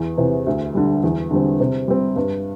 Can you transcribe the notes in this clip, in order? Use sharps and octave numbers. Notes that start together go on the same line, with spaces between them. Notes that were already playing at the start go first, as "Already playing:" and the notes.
Already playing: E2
C3 E3
D2
D3 G3
E2
D3 G3 C4
C3
G3 C4
G2